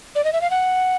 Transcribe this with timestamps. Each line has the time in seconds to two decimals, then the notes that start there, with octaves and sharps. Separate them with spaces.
0.15 D5
0.24 D#5
0.33 E5
0.41 F5
0.51 F#5